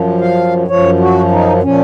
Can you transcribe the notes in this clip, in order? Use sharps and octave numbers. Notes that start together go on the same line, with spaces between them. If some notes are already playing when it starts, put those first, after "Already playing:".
Already playing: F#2 F3
F5
F#2 F3 C#5
F#4
D#4
A#2 F3 C#4